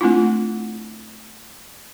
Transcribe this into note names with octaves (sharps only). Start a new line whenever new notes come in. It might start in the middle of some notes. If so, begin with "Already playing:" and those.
A3 C4 D4 E4 F4